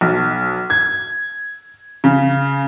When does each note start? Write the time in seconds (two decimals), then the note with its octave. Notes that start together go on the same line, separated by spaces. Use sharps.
0.01 B1
0.70 G#6
2.04 C#3